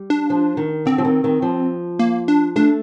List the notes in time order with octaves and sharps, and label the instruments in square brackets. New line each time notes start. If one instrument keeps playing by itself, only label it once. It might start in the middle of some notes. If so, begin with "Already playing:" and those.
Already playing: [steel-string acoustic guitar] G3
[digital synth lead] D4
[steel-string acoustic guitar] F3
D#3
[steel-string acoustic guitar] D3 [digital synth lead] C4
[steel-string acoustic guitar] F3
D#3
D#3
F3
[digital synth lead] A#3
D4
[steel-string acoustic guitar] A3 [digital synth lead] D4